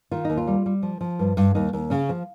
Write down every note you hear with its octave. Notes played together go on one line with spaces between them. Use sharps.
D#3 F4
D#2 D#4
F4
G3
G3
F3
F3
G2
G2
D#2 D#4
D#2
C#3 C#4
F3